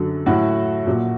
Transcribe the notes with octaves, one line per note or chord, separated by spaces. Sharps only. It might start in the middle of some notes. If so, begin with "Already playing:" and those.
Already playing: F#2 D3 F#3
A2 F#3 F#4
A#2 F#3